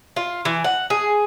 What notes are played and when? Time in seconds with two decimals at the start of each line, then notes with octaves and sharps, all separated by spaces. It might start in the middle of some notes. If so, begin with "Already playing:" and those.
0.16 F4
0.45 E3
0.64 F#5
0.90 G#4